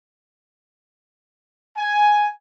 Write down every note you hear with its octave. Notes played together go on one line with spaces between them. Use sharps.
G#5